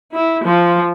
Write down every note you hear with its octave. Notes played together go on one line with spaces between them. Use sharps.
E4
F3